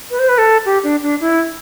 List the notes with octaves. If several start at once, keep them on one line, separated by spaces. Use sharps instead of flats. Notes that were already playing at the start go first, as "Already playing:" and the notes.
B4
C5
B4
A4
G4
D4
D4
E4